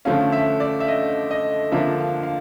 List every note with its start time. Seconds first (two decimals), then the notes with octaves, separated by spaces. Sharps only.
0.05 D3 F3 A3 C#4 F5
0.32 E5
0.60 D5
0.80 E5
0.88 D#5
1.31 D#5
1.72 D3 F3 A#3 D4 F4 E5
2.00 F5
2.23 F5